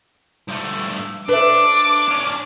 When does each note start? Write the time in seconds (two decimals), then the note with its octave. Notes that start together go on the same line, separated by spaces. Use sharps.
0.49 G2 A3
1.29 D4 B4 E5 D6
2.08 C#4 D4